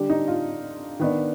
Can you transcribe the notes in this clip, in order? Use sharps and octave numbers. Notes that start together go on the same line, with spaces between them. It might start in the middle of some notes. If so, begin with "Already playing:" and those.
Already playing: D3 G3 D4 G4
D#4
F4
D#3 B3 D4